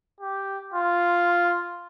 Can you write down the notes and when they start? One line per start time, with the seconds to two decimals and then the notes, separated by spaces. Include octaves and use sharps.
0.20 G4
0.74 F4